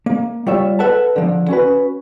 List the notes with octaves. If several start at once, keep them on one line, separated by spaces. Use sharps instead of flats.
A#3
G3 F4 C#5 E5
A4 B4 E5 F#5 A5
D3 F3
C#4 F#4 B4